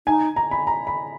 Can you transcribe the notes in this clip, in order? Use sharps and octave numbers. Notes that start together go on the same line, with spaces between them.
D#4 G#5
A#5
B5
A#5
B5